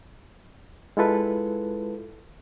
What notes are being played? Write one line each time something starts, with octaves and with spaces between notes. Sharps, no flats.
G#3 E4 F4 A4 B4